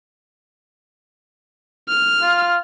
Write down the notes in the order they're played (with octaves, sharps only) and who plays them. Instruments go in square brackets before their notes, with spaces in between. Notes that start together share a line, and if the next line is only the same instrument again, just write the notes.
[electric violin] F6
[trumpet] F4